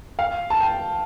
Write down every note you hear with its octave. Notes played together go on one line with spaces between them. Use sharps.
F5
A5
G5